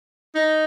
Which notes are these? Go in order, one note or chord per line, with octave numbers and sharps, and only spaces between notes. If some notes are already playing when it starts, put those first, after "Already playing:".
D#4